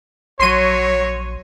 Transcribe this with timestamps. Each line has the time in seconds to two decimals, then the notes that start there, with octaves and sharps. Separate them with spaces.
0.40 A#1 F#3 C#5 C6 D#7